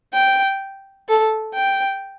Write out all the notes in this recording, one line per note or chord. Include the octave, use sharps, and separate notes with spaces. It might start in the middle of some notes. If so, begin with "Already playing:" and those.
G5
A4
G5